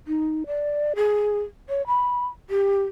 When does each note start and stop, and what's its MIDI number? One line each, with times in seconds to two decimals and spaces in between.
0.07 0.43 63
0.47 0.93 74
0.96 1.41 68
1.69 1.86 73
1.87 2.27 83
2.50 2.83 67